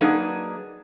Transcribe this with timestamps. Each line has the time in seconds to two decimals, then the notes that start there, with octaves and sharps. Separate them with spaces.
0.01 F#3 A#3 D4 D#4 G#4 B4